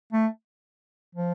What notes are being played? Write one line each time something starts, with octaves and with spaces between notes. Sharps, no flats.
A3
F3